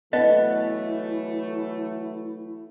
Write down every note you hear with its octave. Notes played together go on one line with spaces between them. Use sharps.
E3 F#3 A3 B3 E4 D#5